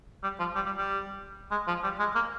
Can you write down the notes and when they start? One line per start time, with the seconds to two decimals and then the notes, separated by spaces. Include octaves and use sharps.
0.23 G3
0.39 F3
0.55 G3
0.66 G3
0.77 G3
1.51 G#3
1.67 F3
1.83 G3
1.99 G#3
2.15 A#3